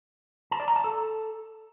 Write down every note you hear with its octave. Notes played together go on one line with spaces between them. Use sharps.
A5
D5
A#5
A5
A4